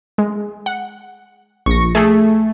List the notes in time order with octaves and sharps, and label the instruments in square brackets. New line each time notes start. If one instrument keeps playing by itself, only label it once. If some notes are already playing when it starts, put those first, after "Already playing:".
[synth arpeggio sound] G#3
F#5
[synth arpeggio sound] A#1 A#6 [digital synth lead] C#6
[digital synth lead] A3 [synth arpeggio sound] G#4 A4